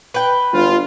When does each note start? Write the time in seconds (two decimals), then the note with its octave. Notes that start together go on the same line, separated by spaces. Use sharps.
0.14 B4 G5
0.53 G1 F4